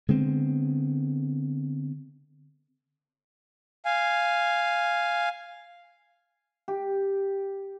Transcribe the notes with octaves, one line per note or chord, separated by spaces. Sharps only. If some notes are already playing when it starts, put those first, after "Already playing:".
D3 G#3 B3 C4
F5 G#5
G4